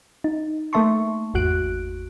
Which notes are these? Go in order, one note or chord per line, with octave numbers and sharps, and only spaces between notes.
D#4
A3 A#3 E5 A5 C6 C#6
G#1 E2 F#4 F#6 D7